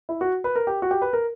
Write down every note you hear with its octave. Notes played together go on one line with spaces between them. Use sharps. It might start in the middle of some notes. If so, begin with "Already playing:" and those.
E4
F#4
B4
A#4
G4
F#4
G4
B4
A#4